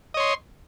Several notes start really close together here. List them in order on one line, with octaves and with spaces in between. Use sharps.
D#5 C#5 C6